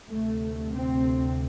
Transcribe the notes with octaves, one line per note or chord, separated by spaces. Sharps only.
D2 C3 A3
C4